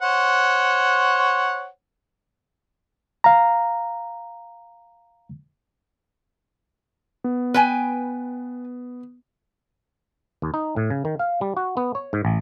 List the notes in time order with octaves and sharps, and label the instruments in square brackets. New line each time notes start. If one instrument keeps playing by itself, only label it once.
[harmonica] C5 C#5 F#5
[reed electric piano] F5 A#5
[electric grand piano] B3
[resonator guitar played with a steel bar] B4 G5 G#5
[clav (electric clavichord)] D#2
D#4
A2
C#3
D#3
F5
G3
F#4
B3
C#5
G#2
A1